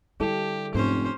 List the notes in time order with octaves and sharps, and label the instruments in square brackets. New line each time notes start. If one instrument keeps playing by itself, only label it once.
[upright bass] D3 [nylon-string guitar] G3 E4 A4 [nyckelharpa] G4
[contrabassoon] F1 [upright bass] G#2 [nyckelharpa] C#4 C5